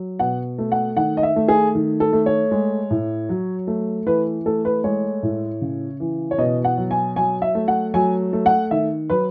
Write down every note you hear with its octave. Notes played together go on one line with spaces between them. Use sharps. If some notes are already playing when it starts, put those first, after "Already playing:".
Already playing: F#3
B2 F#5
A3
F#5
D#3 F#5
D#5
E5
A3
G#4
D#3
A4
A3
C#5
G#3
A2
F#3
A3
E3 B4
A3 A4
B4
G#3 C#5
A2
C#3
E3
C#5
B2 D#5
F#5
F#3
G#5
F#3 G#5
E5
A3
F#5
F#3 G#5
A3
F#5
D#3 E5
F#3 B4